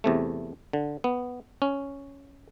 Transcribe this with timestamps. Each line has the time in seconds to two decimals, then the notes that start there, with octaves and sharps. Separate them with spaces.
0.04 E2 C3 A3
0.73 D3
1.04 B3
1.62 C#4